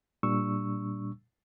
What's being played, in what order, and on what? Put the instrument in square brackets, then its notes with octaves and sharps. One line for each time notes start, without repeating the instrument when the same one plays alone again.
[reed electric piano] A#2 G3 D4 C#6 E6